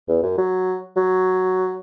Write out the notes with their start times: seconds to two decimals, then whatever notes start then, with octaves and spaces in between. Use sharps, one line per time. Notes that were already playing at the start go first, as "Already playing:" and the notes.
0.08 E2
0.23 F#2
0.38 F#3
0.97 F#3